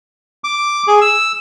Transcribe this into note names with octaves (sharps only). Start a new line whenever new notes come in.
D6
G#4
E6